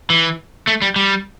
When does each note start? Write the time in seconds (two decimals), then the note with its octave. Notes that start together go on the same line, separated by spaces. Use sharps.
0.10 E3
0.67 A3
0.82 G3
0.96 G3